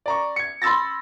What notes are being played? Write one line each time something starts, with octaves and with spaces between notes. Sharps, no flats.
D5 A#5 C#6
G#6 C#7
B5 C6 E6 A6 A#6